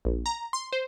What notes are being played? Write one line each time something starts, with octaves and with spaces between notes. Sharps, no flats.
A#1
A#5
C6
C5